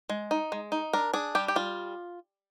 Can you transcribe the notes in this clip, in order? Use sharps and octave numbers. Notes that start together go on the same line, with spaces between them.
G#3
D#4
G#3
D#4
D4 A#4
D4 G#4
G3 G4
G4
G3 F4